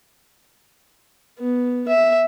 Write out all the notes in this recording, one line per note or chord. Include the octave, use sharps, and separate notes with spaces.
B3
E5